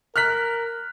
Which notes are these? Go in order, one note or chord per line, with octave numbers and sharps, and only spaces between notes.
A#4 F6 F#6 B6